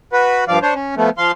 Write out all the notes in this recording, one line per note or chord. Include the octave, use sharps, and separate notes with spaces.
F#4 B4
G2 F3 D5 F5
D4 C5 C#5
C#4
F3 A3 B3
F3 F5 C6